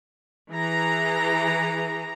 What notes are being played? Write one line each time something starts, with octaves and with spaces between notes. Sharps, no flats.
E3 G#4 A#5